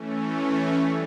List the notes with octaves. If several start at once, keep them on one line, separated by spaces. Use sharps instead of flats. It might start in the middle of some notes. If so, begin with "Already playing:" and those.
Already playing: E3 A3 C#4
G3